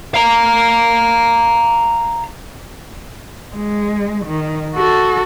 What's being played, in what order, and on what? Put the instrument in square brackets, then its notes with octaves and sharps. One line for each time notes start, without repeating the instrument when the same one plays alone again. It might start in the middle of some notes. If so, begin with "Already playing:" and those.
[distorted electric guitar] F5 A#5
[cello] G#3
D#3
F#4 A4